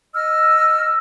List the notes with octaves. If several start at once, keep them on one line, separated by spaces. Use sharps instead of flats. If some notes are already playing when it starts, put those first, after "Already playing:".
D#5 E6 F6